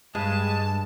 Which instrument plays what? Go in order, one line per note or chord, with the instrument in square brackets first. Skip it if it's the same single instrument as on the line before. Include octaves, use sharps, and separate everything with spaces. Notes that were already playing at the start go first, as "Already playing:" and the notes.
[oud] G2 [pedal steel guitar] G#3 [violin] A5